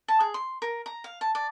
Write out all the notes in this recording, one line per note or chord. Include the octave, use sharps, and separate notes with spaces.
A5
G#4
C6
A#4
A#5
F5
A5
D5